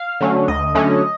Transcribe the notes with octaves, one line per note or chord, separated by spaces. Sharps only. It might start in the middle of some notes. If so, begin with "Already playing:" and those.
Already playing: F5
D3 F#3 A3 C#4
D2 D#5
D3 F#3 A3 C#4